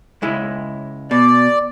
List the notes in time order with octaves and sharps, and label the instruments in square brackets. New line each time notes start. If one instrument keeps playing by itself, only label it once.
[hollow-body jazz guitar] C#2 G#3 E4
[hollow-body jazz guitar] B2 [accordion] D5